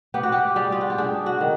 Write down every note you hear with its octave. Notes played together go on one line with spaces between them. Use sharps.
B3 G4
F#4
G4
G3 G#4
F4
F#4
G4
D4 G#4
F#4
D#3